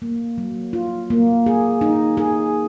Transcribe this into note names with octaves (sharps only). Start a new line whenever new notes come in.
A#3
F#3
F4
A#3
G#4
D#4
G#4